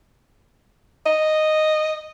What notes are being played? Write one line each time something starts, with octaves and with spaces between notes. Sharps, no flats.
D#5